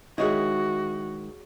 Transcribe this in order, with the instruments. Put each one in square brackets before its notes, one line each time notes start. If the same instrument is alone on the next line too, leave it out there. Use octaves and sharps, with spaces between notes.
[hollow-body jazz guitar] D#3 G#3 E4 [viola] F#4 [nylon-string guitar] G#4 C#5 D#5